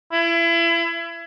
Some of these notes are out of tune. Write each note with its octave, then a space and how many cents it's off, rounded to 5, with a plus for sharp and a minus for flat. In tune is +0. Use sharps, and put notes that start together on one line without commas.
E4 +30